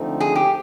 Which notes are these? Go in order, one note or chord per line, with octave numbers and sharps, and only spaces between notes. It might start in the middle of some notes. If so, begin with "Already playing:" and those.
Already playing: D3 F3 A3 C4 D#4
G#4
G4